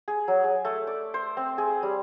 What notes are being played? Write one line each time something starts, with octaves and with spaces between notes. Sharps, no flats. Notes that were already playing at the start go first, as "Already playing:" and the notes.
G#4
F#3
G#4
A3
D5
C5
C4
G#4
G3